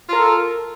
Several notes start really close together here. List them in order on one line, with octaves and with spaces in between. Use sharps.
F4 A#4 A4